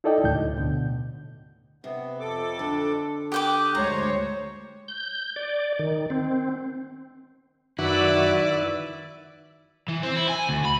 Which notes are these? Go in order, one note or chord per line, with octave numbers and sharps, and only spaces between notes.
D#4 E4 A4 D5 D#5 G5
D2 A2 G6
B2 D3
C3 B3
F2 A4 D6
D3
G4 G5 D6 D#6 F#6
D2 G#3 C5 C#5 A#5
G6
D5
D#3
C4
F#2 D#3 E4 F#4 B4 D5 E5 D6
E3
C4
E4
G#5
D2
B5